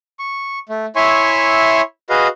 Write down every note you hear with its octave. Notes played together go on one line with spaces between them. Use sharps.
C#6
A3
E4 C#5 E5 G#5 C6 C#6
F#4 G#4 B4 D#5 F5